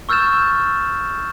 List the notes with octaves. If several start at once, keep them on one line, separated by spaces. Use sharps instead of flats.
C#6 E6 F6 G6 A6 E7